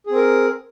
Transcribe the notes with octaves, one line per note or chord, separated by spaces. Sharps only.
C4 G#4 A#4